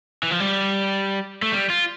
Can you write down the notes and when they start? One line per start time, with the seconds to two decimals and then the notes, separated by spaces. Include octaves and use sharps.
0.23 E3
0.31 F3
0.40 G3
1.42 A3
1.52 G3
1.70 F4